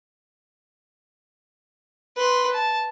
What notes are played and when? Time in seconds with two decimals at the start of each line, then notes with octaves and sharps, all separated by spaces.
2.17 B4 C6
2.53 A5